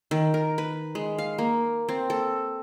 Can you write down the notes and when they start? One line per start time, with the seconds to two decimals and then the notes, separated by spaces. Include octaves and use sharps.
0.11 D#3
0.34 A#4
0.58 B4
0.95 G#3
1.18 F5
1.38 A#3
1.89 C4
2.10 A4